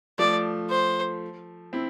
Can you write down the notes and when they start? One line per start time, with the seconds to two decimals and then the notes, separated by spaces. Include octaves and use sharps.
0.18 F3 A3 D5
0.70 C5
1.73 C4 E4